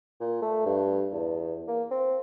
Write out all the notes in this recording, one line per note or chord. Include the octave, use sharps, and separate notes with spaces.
A#2
A3
G2
E2
A#3
C4